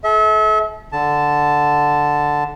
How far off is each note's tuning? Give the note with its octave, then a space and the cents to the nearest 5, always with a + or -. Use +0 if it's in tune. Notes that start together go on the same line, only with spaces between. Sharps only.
A4 -40 E5 -35
D3 +0 A5 +0